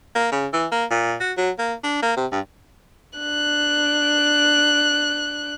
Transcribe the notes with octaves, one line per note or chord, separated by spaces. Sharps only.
A#3
C#3
E3
A#3
A#2
F#4
F#3
A#3
D4
A#3
C3
G2
D4 F#6